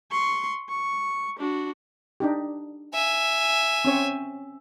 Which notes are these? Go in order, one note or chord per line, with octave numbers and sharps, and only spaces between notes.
C6 C#6
C#6
D4 F#4
D4 D#4 G4
E5 G#5
C4 C#4 C#5